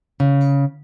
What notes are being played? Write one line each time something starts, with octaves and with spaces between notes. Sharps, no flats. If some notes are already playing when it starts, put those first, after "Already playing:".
C#3